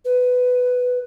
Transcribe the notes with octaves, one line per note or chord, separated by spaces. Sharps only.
B4